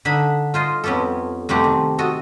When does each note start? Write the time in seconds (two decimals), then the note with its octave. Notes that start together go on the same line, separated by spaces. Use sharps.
0.05 D3 D#4 E5 B5
0.54 F4 C5 D#5
0.84 F2 B3 C#4 G4 A4
1.49 F2 C3 A3 C4 G4 F#5
1.64 D#3
1.99 F#4 A4 D#5